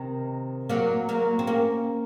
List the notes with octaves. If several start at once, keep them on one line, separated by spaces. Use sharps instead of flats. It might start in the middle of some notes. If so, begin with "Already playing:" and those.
Already playing: C3 D#3
F#3 A#3
F#3 A#3
C4
A#3 C#4